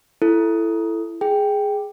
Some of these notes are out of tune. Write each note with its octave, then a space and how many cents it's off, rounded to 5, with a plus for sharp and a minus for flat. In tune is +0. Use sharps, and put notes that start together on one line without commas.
E4 +15 A4 +0
G#4 +0 G5 +0